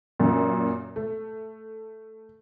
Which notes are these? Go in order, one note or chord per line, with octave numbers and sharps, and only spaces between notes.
F#2 A#2
A3